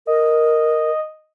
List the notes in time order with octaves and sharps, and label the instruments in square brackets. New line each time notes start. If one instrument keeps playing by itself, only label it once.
[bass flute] A#4 [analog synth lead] D#5